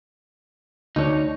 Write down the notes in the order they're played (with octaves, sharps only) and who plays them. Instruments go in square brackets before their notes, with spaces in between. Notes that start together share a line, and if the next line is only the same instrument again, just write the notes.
[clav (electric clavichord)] D2 D4 [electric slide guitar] D#4 C#5